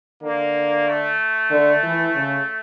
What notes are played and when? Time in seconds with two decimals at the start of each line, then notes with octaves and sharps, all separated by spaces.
0.22 D3 A#3
0.87 A3
1.50 D3
1.83 E3
2.15 C#3